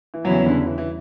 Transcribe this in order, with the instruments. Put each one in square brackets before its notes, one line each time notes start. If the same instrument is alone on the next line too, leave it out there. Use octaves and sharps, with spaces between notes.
[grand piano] E3
[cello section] E2 C#3 G3 C#4 E4 [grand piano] F#3
[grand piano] D3
E3
E3